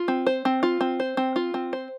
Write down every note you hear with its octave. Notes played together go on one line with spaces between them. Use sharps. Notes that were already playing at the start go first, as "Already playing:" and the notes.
Already playing: F4
C4
C5
C4
F4
C4
C5
C4
F4
C4
C5